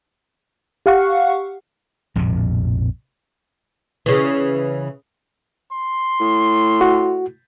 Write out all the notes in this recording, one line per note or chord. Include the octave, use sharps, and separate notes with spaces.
G4 F5 F#5 C#6
A#1 F2 A2 C3
C#3 E3
C6
A2
F#4